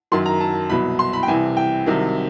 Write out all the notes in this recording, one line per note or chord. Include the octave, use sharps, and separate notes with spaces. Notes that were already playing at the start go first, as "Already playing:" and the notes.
F#2 D#3 F#3 C6
A#5
A5
C2 B2 F#3 B5
C6
B5
G5
C2 C3 E3 G#5
G5
C2 C3 D#3 F#3